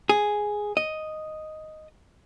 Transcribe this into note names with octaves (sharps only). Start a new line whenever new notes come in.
G#4
D#5